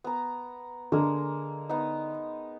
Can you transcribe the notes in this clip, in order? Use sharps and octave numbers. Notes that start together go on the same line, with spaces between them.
B3 A#5
D3 G#3 A#3
B3 D#4